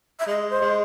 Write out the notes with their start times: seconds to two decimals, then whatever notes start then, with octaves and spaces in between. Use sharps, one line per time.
0.20 E5
0.27 G#3 D#5
0.50 C5
0.61 G#3